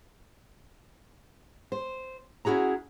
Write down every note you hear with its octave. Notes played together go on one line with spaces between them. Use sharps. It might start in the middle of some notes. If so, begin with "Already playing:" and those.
C5
C#4 E4 F#4 G#4 A#5